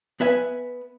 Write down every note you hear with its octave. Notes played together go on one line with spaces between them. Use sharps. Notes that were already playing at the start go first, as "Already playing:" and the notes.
B3 B4 E5 G#5